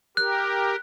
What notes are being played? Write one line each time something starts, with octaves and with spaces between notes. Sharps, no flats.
G4 A#4 F#6